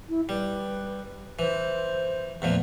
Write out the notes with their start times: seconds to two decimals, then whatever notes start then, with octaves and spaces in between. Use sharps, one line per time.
0.09 E4
0.29 G3 B4
1.39 E3 C5
2.42 E2 A#2 F3 A3